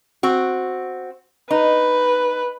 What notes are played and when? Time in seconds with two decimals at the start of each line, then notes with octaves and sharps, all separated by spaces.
0.23 C4 F#4
1.51 D#4 B4